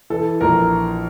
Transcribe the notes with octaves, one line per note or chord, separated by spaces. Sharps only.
E3 A4
A#1 A#4